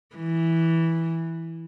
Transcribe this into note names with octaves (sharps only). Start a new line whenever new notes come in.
E3